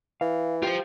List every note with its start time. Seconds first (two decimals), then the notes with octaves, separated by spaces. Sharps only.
0.21 E3 F5
0.63 F4 G4 C5 G5